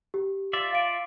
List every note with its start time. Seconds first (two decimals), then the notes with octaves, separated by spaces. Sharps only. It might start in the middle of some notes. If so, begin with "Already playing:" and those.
0.14 G4
0.53 F4 D5 E5
0.73 F5 D7